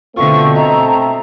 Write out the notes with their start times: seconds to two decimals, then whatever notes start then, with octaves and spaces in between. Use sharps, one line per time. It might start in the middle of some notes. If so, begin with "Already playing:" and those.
0.16 B2 D3 A3 C4 F4 C#6
0.55 B2 D#5 E5 A5 A#5